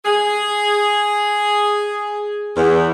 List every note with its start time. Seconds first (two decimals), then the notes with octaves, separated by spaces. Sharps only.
0.05 G#4
2.57 E2